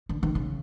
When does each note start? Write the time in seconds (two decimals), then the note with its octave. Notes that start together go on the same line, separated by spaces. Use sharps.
0.09 D3
0.23 D#3
0.35 C#3